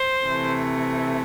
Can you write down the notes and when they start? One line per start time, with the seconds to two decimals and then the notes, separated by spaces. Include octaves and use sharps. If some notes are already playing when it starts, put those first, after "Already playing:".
Already playing: C5
0.25 C3 E3 A3